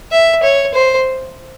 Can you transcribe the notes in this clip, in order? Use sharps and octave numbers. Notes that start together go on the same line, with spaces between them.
E5
C#5
C5